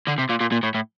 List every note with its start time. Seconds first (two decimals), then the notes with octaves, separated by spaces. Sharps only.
0.08 D3
0.19 C3
0.30 A#2
0.41 A#2
0.52 A#2
0.63 A2
0.74 A2